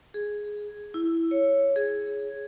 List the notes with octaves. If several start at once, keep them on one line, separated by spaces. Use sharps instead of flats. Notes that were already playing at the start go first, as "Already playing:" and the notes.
G#4
E4
C#5
G#4